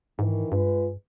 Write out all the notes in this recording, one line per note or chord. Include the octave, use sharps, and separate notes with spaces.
G#2 D#3 E3
G2 G#3 F4 B4